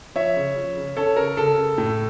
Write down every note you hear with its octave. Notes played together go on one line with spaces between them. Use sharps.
F3 C#5 E5
C#3
F3
C#3
C#4 A4 C#5
C#3 A#4
C#3 A4
C#3
A2